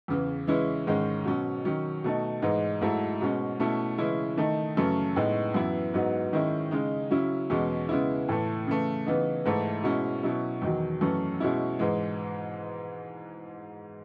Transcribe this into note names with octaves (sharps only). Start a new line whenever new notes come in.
E2 C#3 E3
C#3 E3 G#3 C#4 E4
G#2 D#3 G#3 C#4
B2 F#3 C#4
D#3 F#3 C#4
B2 A3 D#4
G#2 E3 G#3 D#4
G#2 F#3 A3 E4
B2 G#3 C#4
B2 A3 C#4 E4
C#3 E3 G#3 C#4 E4
D#3 A3 D#4
F#2 C#3 E3 A3 C#4
A2 G#3 B3 D#4
F#2 E3 B3 E4
G#2 F#3 B3 D#4
D#3 G#3 C#4 E4
C#3 G#3 D#4
C#3 F#3 C#4 E4
E2 B2 G#3 C#4
C#3 G#3 B3 E4
A2 E3 A3
C#3 E3 A3
C#3 E3 B3 D#4
G#2 E3 A3 E4
B2 G#3 C#4 E4
B2 F#3 C#4 E4
E2 D#3 F#3
F#2 E3 A3 C#4
B2 G#3 C#4 E4
G#2 E3 G#3